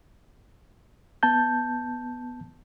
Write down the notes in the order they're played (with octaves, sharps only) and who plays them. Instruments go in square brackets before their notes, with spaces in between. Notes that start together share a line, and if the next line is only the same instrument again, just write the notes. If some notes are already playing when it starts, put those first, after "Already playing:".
[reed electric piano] B3 A5 G6